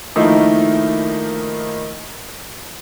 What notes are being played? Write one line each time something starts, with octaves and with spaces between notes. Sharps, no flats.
D#3 F3 A3 A#3 D#4 E4